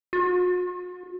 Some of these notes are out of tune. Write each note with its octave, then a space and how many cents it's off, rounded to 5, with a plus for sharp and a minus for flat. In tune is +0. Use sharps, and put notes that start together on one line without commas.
F#4 -45